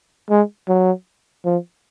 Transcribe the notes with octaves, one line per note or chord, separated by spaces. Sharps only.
G#3
F#3
F3